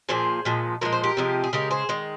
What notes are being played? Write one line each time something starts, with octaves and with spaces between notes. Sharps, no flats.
A#2 F3 A#3 G#4 C5
A#2 F3 G#3
A#2 F3 G#3 A#4
C5
G4 A#4
C3 F3 G#3
G#4
C#3 G#3 G4 A#4
G#4 C5
D#3 G#3